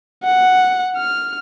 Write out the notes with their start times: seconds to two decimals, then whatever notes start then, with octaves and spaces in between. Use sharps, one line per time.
0.24 F#5
0.97 F6